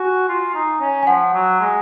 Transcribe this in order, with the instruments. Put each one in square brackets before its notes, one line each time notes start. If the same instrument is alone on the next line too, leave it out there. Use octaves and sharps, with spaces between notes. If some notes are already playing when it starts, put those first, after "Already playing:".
Already playing: [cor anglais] F#4 [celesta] G#5
[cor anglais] F4
D#4
C#4
[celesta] G#5
[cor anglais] F3 [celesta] F#5
[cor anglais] F#3
G#3